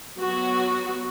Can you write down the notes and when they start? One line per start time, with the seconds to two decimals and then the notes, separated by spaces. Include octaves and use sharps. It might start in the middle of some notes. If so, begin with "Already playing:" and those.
0.17 F#3 B3 F#4